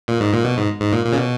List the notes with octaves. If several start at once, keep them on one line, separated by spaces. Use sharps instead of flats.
A#2
G#2
A#2
B2
G#2
G#2
A#2
A#2
C#3
B2